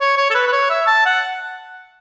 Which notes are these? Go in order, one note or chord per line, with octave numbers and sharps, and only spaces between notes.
C#5
C#5
A4
B4
B4
C#5
E5
A5
F#5